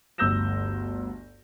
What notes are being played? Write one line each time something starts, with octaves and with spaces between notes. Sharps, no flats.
G1 D2 E6 G6 A#6 E7